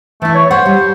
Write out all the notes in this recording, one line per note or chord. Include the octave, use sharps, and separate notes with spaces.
E3 A3 E4
C#5
C5 C#5 F#5
G3